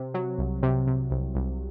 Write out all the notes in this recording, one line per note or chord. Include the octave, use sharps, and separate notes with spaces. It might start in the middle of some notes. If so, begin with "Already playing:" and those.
Already playing: C3
F#3
C2
C3
C3
C2
C2